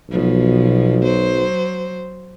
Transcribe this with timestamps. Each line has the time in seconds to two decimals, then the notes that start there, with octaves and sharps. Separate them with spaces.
0.10 B1 B2 F3
1.04 F#3 C5